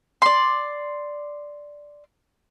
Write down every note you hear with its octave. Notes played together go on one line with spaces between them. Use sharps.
D5 C6